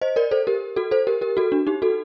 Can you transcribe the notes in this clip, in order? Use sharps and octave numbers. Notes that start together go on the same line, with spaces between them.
C5 D#5
A#4 D5
A4 C5
G4 A#4
F#4 A4
A4 C5
G4 A#4
G4 A#4
F#4 A4
D4 F#4
D#4 G4
F#4 A4